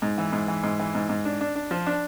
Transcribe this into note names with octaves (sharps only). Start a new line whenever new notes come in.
G#2
E3
G#2
E3
G#2
E3
G#2
G#2
D4
D4
D4
F3
D4